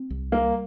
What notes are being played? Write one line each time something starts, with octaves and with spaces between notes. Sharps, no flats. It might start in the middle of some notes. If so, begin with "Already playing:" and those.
Already playing: C4
C2
G3 A#3